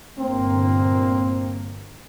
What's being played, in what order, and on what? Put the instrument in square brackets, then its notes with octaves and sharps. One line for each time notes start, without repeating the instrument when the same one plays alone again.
[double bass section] G1 A#2 A#3 [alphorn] C4